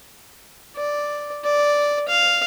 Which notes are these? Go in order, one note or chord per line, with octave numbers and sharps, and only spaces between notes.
D5
D5
F5